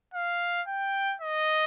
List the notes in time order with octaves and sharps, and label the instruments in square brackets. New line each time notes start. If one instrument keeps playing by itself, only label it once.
[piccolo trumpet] F5
G5
D#5